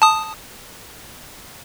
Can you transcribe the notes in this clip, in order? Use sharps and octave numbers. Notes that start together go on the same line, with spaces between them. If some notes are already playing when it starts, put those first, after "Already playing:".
A5 D#6